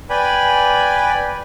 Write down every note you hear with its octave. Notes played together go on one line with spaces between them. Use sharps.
B4 D5 G5 G#5 B5